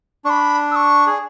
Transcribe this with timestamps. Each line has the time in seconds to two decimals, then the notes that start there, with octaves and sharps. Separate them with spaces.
0.25 D4 C#6
0.30 B5
0.71 E6
0.76 C#6
1.07 G#4